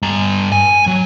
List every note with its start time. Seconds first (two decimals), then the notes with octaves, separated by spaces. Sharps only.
0.02 G2 A#5
0.52 G#5
0.87 F#3